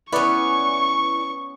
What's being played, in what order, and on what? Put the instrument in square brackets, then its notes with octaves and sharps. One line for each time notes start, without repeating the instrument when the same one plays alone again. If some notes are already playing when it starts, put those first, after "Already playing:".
[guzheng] B3 C#4 [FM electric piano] E4 B4 D5 [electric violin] C#6